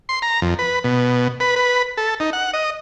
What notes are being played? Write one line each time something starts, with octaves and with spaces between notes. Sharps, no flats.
C6
A#5
F2
B4
B2
B4
B4
A4
D#4
F#5
D#5